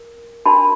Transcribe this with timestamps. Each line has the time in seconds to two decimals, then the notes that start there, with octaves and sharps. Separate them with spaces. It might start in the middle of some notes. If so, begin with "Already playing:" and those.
Already playing: A#4
0.46 D4 F#4 A#4 A5 B5